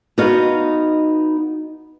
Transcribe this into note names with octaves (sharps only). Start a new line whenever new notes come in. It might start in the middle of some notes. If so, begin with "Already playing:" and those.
B3 D#4 F#4 D#5 F5